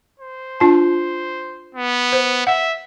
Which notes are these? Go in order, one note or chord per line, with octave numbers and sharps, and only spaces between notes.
C5
D4 F4 A5
B3
C5
E5 F#5